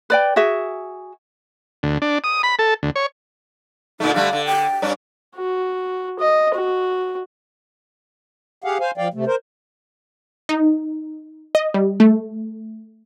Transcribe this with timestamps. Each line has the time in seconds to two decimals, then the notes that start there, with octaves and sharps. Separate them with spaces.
0.10 B4 D5 G5
0.36 F#4 G#4 E5
1.83 D2
2.02 D4
2.24 D#6
2.43 B5
2.59 A4
2.83 D2
2.96 C#5
4.00 A#2 D3 A3 D#4
4.14 D3 G3 A3 F5
4.33 D3
4.46 G5
4.82 G2 C#4 D4
5.36 F#4
6.19 D#5
6.54 F#4
8.64 G4 G#4 F5 F#5
8.80 C5 F5 G#5
8.98 F3 D5 F5 G5
9.14 C3 A3
9.27 A#4 C5
10.49 D#4
11.55 D#5
11.74 G3
12.00 A3